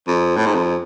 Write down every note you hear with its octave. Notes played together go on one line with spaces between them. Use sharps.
F2
A2
G#2
F2